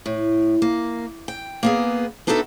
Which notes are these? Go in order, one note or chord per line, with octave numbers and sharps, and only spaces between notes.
A2
A#3
G5
A#3 B3 G#4
B3 D4 D#4 F#4 A4 E5